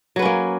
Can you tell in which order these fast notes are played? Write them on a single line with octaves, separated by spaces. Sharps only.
F#3 B4 C#4 A#3